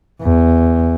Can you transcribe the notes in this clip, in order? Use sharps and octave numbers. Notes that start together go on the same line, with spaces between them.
E2